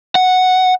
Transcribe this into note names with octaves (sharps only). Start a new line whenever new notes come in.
F#5